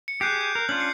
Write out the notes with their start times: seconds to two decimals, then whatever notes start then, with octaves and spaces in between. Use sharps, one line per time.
0.08 C#7
0.21 G4 G#4 F#6 G6 C7
0.41 G6
0.55 A#4
0.69 C#4 D4 F4 F#7
0.80 C7 C#7